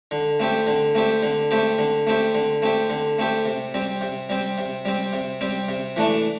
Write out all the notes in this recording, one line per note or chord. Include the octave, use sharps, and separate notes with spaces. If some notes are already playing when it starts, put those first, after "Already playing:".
D3
A3 C4 G4
D3
A3 C4 G4
D3
A3 C4 G4
D3
A3 C4 G4
D3
A3 C4 G4
D3
A3 C4 G4
C3
G3 C4
C3
G3 C4
C3
G3 C4
C3
G3 C4
C3
E3 A3 D4